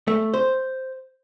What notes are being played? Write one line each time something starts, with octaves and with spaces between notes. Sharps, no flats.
A3
C5